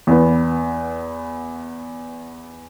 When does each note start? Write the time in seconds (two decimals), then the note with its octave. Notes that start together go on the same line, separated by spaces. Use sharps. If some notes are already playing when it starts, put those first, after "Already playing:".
0.07 E2 B3